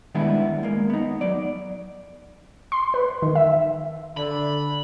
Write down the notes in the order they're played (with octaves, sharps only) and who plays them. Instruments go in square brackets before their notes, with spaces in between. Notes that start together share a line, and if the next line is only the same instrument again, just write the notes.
[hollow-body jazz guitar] D#3 G3 G#3 B3 D4 E4
G#3 A#3
B3 D#4
F#3 D5
[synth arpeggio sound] C6
B4
D#3
E5
[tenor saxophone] D3 [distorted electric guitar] B5